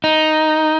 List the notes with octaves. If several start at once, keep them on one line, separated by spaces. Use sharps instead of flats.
D#4